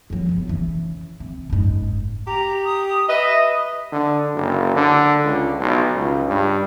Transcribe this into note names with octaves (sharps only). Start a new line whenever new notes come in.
F2 F#3
F1 B3
C#3 E3
C3
F#1 G#2
G4 A#5
D#6
B4 D#5 E5
D3
F#1
D3
C#2
B1
C#2
G2